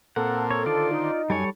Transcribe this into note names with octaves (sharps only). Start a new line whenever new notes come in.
A#2 A#3 C4 A4 F#5
C#5
D3 D#3 F4 C5 D5
D#4
F#2 G3 A4 C#5 G#5